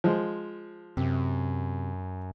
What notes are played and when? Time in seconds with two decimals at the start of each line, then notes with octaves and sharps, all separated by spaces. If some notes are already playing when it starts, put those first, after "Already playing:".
0.04 F3 G#3
0.97 F#2 C3